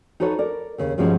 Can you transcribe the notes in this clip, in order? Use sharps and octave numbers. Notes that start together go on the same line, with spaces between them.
D#4 F#4 A4 B4 C#5
A#4 D5
D#2 C#3
G2 B2 F3 G3 G#3 C#4